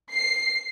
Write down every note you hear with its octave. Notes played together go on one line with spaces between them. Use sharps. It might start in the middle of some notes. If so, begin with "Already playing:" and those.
C7